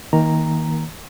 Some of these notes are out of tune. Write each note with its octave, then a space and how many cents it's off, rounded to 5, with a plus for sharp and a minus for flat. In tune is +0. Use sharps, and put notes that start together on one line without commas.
D#3 +25 A#3 +0 A#5 +0